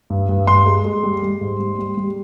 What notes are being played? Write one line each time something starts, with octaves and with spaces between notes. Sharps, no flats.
G2
G2
G2 C6
G#3
G#3
G3
G3
G#2
G3
G3
G3